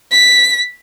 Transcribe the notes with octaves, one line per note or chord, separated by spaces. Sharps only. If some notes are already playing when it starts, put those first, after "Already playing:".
B6